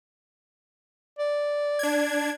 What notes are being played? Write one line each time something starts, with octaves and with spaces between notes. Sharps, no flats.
D5
D4 G#6